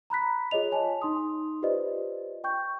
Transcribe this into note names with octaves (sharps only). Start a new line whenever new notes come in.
A#5 B5 F#6 B6
F4 G#4 C#5 D#5 F7
C#5 G#5 A5
D#4 C6 D#6
F4 G4 B4 C5 D5 D#5
G5 C#6 G6